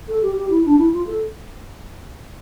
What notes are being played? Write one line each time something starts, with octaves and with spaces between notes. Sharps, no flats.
A4
G4
G4
E4
D4
E4
F4
A4